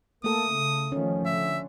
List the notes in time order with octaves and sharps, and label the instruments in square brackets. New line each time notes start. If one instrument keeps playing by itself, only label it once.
[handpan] A3 A4 [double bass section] A#3 [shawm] D#6
[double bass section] C#3
[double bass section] D#3 F3 A3 [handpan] C#4
[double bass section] D3 [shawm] E5